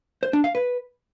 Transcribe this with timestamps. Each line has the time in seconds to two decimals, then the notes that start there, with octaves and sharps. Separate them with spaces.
0.23 C5
0.33 D4
0.44 F5
0.55 B4